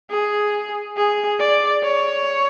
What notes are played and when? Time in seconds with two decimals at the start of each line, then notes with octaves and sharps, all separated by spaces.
0.11 G#4
0.97 G#4
1.40 D5
1.83 C#5